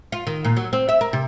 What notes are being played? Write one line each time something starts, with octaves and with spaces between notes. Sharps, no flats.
F4
D#3
A#2
F#3
C4
E5
A#4
C3